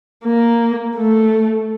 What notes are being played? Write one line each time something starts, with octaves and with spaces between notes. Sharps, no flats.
A#3
A3